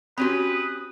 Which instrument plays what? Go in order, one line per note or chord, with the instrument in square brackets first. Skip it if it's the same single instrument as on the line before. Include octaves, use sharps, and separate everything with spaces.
[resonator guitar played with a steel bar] C4 C#4 G4 [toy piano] F#4 B5 [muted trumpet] B4 [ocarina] D#6